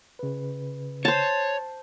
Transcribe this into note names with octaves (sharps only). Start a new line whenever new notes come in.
C#3 B4
C5 C#5 A5